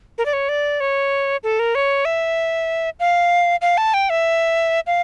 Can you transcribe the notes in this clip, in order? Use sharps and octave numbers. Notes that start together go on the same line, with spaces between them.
A#4
D5
C#5
D5
C#5
A4
A#4
C#5
E5
F5
F5
A5
G5
E5
F5